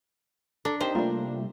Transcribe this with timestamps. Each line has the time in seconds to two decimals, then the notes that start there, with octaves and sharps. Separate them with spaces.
0.65 D4 A4 A#5
0.80 C4 D#4 G4 A#4 C5 D#5 A5
0.95 C3 G3 A3 A#3 D4 F4 A#4